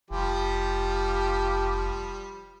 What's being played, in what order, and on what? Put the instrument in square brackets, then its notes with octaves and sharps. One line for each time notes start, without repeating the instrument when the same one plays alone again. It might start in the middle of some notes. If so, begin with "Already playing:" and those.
[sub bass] F1 [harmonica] F3 G3 [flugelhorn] G4